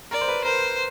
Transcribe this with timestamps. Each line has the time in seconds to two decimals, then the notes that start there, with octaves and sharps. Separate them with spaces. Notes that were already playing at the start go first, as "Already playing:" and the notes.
0.11 A#4 D5
0.21 C5
0.28 B4
0.44 A#4 C5